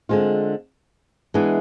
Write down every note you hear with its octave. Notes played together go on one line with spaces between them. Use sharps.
D3 G#3 C4 F4
E3 G#3 B3 D4